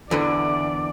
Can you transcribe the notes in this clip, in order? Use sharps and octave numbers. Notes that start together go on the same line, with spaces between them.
E2 D3 E3 D5